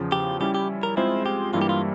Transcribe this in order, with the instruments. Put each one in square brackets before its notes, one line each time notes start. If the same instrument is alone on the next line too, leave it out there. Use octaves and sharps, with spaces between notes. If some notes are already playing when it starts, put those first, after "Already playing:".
Already playing: [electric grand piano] E2 C#3 F3
[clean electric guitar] G4
[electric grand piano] G3 C#4 E4 [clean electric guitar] G4
[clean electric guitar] G4
A#4
[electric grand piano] G#3 C4 F4 G#4 C5 [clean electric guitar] E4
[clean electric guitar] G4
[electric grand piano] G2 E3 G3 A#3 E4 [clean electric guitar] F4
[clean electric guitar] G4
F4